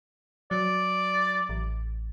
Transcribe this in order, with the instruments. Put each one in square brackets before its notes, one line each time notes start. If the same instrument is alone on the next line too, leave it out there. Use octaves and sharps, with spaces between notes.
[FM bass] F#3 [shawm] D5
[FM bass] A1